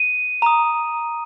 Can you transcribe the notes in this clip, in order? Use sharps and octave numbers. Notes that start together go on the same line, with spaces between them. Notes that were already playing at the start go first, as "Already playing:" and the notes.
Already playing: D#7
A#5 D#6